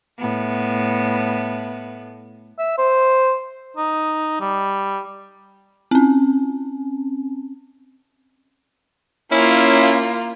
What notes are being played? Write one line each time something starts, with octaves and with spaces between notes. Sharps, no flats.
A2 B3
E5
C5
D#4
G3
C4 C#4
A#3 C#4 E4 F4